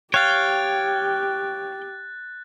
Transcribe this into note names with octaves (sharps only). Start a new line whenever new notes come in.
G4 C#5 F5 G5 F#6 A6